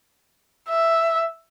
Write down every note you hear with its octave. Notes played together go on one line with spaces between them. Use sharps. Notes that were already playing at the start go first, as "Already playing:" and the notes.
E5